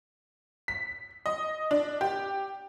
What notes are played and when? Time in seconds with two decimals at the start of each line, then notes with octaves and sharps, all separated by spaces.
0.68 B6
1.26 D#5
1.71 D4
2.01 G4